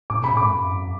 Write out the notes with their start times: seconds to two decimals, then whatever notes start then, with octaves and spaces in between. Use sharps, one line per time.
0.10 A2 D6
0.21 B2 B5
0.31 A2
0.37 G#2 D6
0.50 F#2